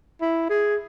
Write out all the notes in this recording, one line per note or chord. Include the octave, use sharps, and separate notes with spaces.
E4
G#4